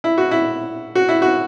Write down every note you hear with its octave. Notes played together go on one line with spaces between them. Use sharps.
E4
F#4
E4
F#4
E4
F#4